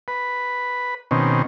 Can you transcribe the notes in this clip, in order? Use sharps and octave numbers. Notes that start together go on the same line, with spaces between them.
B4
B2 D#3 C4 C#4